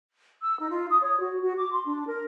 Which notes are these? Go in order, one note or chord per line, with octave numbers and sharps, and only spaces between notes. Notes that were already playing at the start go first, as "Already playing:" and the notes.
E6
D#4
F4
D#6
C#5
F#4
F#4
D6
C6
D4
A#4